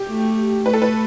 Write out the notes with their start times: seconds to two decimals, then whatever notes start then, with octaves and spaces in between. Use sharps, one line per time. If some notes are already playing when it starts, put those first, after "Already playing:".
Already playing: G4
0.08 A3
0.65 A3 B4
0.73 A4
0.82 B4